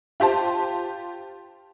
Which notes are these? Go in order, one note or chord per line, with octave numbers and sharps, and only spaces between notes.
F4 G4 C5 A5